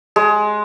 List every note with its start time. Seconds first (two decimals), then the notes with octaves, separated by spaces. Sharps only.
0.16 G#3